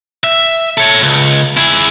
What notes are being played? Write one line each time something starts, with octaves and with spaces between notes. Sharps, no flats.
E5
A4 C#5
C#2
E4 G#4